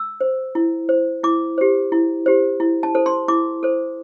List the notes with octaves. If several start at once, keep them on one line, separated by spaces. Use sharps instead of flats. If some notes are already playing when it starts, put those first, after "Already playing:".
Already playing: E6
C5
E4
C5
E4 D6
G4 C5
E4
G4 C5
E4
A5
A4 C5
C6
E4 D6
A4 C5